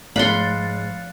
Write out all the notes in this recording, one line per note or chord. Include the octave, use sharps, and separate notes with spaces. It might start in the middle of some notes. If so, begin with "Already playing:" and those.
G#2 F3 F5 B5 C6 F#6 A6 C#7